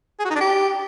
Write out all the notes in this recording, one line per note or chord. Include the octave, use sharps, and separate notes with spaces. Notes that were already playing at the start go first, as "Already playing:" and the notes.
G#4
F#4
D#4
D4
G4